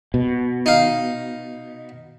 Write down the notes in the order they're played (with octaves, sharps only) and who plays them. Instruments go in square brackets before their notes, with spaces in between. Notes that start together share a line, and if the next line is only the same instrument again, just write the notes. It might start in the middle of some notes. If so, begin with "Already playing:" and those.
[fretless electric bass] B2
[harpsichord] D#4 F5